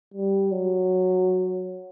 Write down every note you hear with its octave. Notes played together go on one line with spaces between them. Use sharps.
G3
F#3